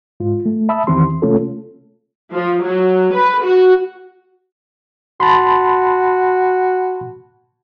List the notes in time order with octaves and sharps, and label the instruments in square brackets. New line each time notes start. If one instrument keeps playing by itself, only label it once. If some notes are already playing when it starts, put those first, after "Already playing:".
[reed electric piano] G#2 F4
A3
E5 A5 B5 D#6 E6
E2 D#3 E3 C4 G4 C6
C3 A3 C#4 F4 A4
[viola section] F3
F#3
B4
F#4
[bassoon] F#4 [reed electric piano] A5 B5 C6